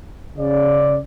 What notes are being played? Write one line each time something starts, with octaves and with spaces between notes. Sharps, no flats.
C#3 D5